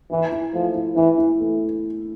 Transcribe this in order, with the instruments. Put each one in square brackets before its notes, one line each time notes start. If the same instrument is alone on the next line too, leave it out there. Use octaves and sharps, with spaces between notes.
[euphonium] E3 [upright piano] E4
[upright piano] E4
[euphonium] F3 [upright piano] A3
[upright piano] E4
[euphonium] E3 [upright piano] E4
[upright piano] E4
A3